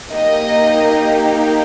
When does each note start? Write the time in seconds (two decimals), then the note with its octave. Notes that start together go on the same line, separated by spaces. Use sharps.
0.14 A#3 D#4 G4 D#5